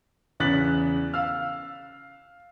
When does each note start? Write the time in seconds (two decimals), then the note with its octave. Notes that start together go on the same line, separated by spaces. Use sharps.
0.40 E2 C#3 F#6 A6 B6 F#7
1.14 F5 E6 F6